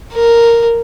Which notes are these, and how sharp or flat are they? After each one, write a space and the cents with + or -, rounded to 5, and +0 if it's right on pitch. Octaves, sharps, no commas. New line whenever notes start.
A#4 -5